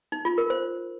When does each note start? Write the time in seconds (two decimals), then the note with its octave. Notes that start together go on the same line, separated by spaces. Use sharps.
0.12 D#4
0.25 F4
0.38 A#4
0.50 C5